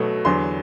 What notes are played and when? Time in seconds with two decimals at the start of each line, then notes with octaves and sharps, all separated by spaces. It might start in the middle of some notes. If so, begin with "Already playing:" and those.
Already playing: B2 F#3 A3
0.25 E2 D3 F#3 C6